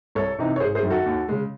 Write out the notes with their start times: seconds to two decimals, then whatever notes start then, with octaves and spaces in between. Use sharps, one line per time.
0.15 C2 A4 C#5
0.39 C3 E3 C4 D#4
0.56 C#5
0.60 G#1 G#4 C5
0.75 G#4 C5
0.83 F#2 D#3
0.90 F#4 A4
1.06 D#2
1.28 C#3 G#3